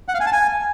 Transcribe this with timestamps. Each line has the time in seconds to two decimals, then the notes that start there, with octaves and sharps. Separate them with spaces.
0.08 F#5
0.14 F5
0.20 G#5
0.26 A5
0.32 G#5